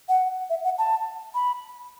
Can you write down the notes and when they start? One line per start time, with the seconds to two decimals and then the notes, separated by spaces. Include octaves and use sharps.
0.09 F#5
0.50 E5
0.64 F#5
0.78 A5
1.35 B5